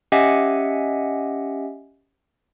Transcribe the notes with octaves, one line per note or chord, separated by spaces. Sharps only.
C#4 G4 D#5 E5 F#5 G#5